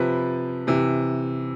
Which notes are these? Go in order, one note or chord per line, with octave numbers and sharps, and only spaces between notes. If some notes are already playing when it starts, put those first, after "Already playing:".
Already playing: C3 F3 B4 B5
C3 E3